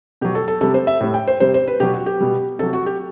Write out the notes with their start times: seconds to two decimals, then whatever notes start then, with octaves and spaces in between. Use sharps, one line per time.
0.21 B2 F#3 G4
0.35 A4
0.48 A4
0.61 C3 G3 A4
0.74 C5
0.87 E5
1.01 A2 G3
1.14 G5
1.28 C5
1.40 C3 G3 C5
1.54 C5
1.67 B4
1.80 B2 F#3 G4
1.94 F#4
2.06 G4
2.20 B2 G3
2.59 C3 F#3 A4
2.73 F#4
2.86 G4